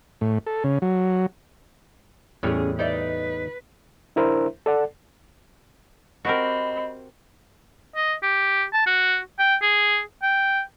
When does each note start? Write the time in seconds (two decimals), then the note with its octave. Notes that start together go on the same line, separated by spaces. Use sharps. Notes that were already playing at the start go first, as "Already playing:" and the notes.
0.21 A2
0.46 A4
0.64 C#3
0.82 F#3
2.43 E2 A2 G3 C#4 G#4
2.79 D#4 B4 D5 E5
4.16 D4 E4 A#4 C5 E5
4.66 A4 D5 F#5
6.25 C4 F#4 G4 A#4 D#5 B5
7.96 D#5
8.23 G4
8.73 A5
8.86 F#4
9.39 G5
9.62 G#4
10.22 G5